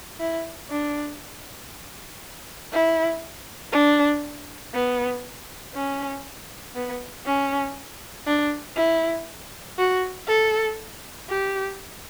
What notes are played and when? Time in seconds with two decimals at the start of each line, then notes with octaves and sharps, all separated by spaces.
0.20 E4
0.70 D4
2.72 E4
3.73 D4
4.74 B3
5.74 C#4
6.75 B3
7.26 C#4
8.27 D4
8.76 E4
9.78 F#4
10.28 A4
11.29 G4